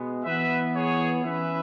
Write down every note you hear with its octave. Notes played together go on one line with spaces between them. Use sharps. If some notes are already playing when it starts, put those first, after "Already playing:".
Already playing: B2 G#3 B3
E3 B3 B4 E5
G#4 C#5
E3 C#4 B4 E5